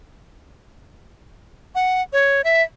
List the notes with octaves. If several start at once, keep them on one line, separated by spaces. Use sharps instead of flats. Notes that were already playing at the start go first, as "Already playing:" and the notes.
F#5
C#5
E5